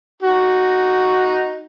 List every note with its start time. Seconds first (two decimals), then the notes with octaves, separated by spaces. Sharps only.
0.22 D#4 F#4